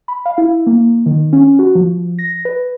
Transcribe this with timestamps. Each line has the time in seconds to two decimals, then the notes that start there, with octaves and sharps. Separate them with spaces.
0.08 B5
0.26 F5
0.38 E4
0.67 A#3
1.06 D#3
1.33 C#4
1.59 F#4
1.75 F3
2.19 A#6
2.45 B4